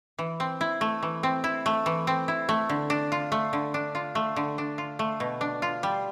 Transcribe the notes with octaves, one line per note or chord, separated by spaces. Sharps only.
E3
C4
E4
A3
E3
C4
E4
A3
E3
C4
E4
A3
D3
D4
F4
A3
D3
D4
F4
A3
D3
D4
F4
A3
B2
D4
F4
G3